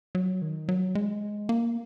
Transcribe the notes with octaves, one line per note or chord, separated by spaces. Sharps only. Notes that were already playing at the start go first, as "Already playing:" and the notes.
F#3
D#3
F#3
G#3
A#3